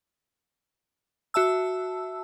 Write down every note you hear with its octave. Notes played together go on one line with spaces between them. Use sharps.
F#4 E5 A5 E6